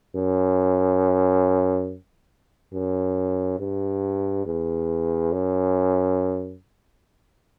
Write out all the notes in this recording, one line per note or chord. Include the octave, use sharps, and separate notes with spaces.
F#2
F#2
G2
E2
F#2